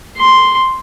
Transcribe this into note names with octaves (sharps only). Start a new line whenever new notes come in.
C6